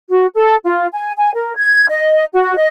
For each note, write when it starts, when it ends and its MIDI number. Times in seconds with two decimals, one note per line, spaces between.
0.10 0.26 66
0.35 0.56 69
0.65 0.87 65
0.92 1.12 80
1.17 1.30 80
1.35 1.55 70
1.57 1.84 92
1.88 2.24 75
2.33 2.54 66
2.57 2.68 75